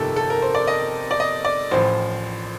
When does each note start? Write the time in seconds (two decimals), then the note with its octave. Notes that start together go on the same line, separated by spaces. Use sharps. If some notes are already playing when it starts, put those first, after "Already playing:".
Already playing: G1 F2 C3 D#3 A4 A#4
0.16 A4
0.30 A#4
0.42 C5
0.55 D5
0.67 D#5
1.11 D5
1.20 D#5
1.45 D5
1.71 A1 A2 F3 C5